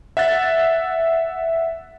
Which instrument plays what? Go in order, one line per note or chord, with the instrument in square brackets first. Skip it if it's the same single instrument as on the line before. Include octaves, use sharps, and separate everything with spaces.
[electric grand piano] E5 F#5 F#6 A6